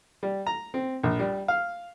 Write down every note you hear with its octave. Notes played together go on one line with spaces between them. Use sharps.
G3
A#5
C4
A#1
G3
F5